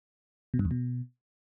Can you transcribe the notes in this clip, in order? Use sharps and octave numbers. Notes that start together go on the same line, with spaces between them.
B2
G2
E2
B2